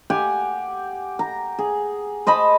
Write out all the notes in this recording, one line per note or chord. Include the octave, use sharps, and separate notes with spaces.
G4 F#5 G#5
A#5
G#4
C5 D#5 A5 B5